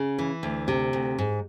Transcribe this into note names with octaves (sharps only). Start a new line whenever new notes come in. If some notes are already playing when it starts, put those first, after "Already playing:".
Already playing: C#3
E3
D2
C3
D2
G#2